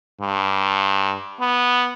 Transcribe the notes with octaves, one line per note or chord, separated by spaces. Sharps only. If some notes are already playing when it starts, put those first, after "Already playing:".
G2
B3